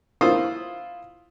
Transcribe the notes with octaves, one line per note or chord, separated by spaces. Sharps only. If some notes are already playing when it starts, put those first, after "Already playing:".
E4 F4 C5 D#6 E6